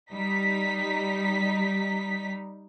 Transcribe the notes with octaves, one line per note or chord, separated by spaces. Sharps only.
G3 D#4 B6